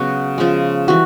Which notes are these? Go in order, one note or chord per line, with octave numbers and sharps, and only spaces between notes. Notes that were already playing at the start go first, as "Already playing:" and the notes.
Already playing: C#3 F#3 B3 F#4
C#3 F3 G#3
E3 G3 F#4